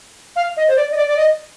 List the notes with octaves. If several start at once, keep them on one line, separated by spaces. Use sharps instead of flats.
F5
D#5
C5
D5
D#5
D5
D5
D#5